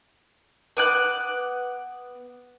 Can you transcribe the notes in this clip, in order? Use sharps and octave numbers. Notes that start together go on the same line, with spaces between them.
B3 D6 F#6